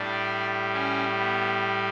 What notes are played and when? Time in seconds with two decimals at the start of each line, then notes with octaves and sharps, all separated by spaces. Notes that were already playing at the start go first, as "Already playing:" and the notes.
Already playing: A2 G3 D4
0.73 C#4
1.18 B3